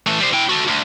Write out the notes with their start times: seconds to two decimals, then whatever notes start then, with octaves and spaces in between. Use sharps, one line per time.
0.07 E3 A3
0.20 G3 C5
0.33 E4 G5
0.49 F#4 A4
0.67 D2